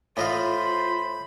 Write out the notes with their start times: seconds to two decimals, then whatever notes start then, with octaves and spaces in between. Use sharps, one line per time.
0.17 A2 F4 C5 D#5 F5 B5